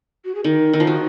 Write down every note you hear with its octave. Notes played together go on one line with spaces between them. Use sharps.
F#4
G#4
D#3 A#4
D#3
F3
D#3 F#4